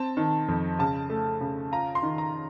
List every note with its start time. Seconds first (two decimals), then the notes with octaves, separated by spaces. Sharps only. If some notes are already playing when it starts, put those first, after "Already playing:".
Already playing: C4 A5
0.17 D#3
0.48 F2
0.79 C#3 A5
1.10 A3
1.41 C#3
1.72 F4 A#5
1.95 C6
2.03 D#3
2.18 A#5